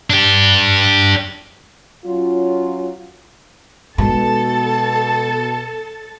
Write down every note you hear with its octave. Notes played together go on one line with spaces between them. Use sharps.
D4 G4
F#3 C#4 F4
B2 G#3 D#4 A4 A5 A6